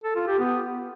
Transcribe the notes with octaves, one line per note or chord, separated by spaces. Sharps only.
A4
F4
G4
B3